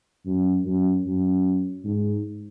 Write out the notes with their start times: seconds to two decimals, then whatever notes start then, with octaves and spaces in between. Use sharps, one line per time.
0.26 F#2
0.65 F#2
1.06 F#2
1.84 G#2